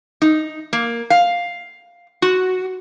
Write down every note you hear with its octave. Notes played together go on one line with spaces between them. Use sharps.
D#4
A#3
F5
F#4